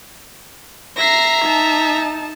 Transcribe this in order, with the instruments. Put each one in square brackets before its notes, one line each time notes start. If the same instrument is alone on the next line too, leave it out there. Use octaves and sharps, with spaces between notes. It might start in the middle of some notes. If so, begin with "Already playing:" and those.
[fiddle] E5 A#5 [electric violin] A#6 C7
[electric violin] D#4 A5